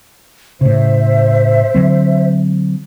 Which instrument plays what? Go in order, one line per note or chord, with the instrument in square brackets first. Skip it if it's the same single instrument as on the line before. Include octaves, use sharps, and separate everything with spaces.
[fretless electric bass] A2 C#3 [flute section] C5 E5
[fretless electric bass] D3 F#3 C4